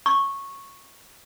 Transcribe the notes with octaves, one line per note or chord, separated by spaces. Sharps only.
C#6